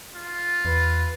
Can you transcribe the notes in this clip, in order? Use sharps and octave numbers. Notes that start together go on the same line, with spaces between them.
F4
E2 B4